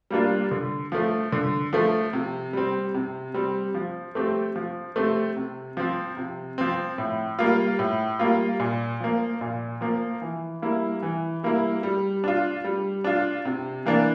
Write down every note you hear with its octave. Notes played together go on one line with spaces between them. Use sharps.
G3 A#3 D4 F4
D3
F3 A3
D3
F3 A3
C3
G3 C4
C3
G3 C4
F3
A3 C4 G4
F3
A3 C4 G4
C3
F3 C4
C3
F3 C4
A2
G3 A#3 F4
A2
G3 A#3 F4
A#2
F3 A#3
A#2
F3 A#3
E3
G3 A#3 E4
E3
G3 A#3 E4
G3
D4 F4
G3
D4 F4
C3
E3 A#3 D4